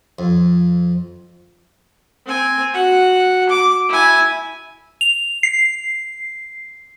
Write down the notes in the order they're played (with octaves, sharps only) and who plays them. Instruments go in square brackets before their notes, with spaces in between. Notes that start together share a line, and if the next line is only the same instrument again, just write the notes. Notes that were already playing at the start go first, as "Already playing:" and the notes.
[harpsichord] F2
[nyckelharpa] C4 G#5
F#4 F#5
D6
E4 G#5
[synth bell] F7
C7